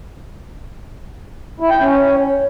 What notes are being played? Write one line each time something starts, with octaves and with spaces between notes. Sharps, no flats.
E4
G5
C#4